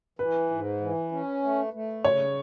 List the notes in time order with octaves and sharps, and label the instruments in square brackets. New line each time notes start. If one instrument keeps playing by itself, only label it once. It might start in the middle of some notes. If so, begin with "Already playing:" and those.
[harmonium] E3 [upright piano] B4
[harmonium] G#2
E3
C#4
A3
A3
[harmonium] C#3 [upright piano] C#5